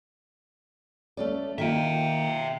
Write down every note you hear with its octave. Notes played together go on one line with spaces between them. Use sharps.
A3 C#4 D5
D#3 A#3 F4 E5 G5